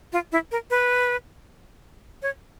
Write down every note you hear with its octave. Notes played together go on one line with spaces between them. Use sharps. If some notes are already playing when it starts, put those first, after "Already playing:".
F4
E4
A#4
B4
C#5